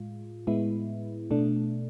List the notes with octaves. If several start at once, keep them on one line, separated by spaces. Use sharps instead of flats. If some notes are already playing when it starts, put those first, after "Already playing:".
Already playing: A2 G#3 F4
A2 G#3 B3 E4
B2 A3 D4